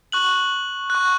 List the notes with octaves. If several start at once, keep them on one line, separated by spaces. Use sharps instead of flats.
C#6 F#6 F#7
C#6 F#6